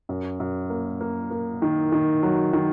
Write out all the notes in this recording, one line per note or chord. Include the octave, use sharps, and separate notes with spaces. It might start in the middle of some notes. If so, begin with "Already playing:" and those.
F#2
F#2
A#3
A#3
A#3
D#3
D#3
F#3
D#3